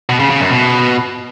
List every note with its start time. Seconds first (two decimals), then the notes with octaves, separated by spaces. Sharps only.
0.09 B2
0.20 C#3
0.30 C#3
0.40 F#2
0.51 B2